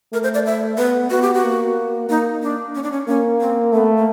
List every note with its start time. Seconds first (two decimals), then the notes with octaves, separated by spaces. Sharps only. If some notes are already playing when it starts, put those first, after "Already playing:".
0.12 A3 A#4
0.23 C5
0.34 D5
0.46 E5
0.78 B3 B4
1.11 B3 F#4
1.22 G4
1.34 F#4
1.44 A#3
2.09 A#3 D#4
2.43 D4
2.75 C#4
2.83 D4
2.92 C#4
3.08 A#3 C#4
3.41 C4
3.73 A3 B3
3.97 A#3